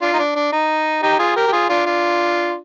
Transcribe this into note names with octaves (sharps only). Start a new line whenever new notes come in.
D4 F4
D#4
D4
D4
D#4
D#4 G4
F4 G#4
G4 A#4
G4
F4 G#4
D4 F4
D4 F4